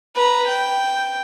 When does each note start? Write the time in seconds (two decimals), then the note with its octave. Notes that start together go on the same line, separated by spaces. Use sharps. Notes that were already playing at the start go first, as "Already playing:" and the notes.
0.15 B4 A#5
0.48 G5